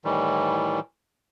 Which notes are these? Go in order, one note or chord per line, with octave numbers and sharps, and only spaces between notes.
A2 D#3 E3 G3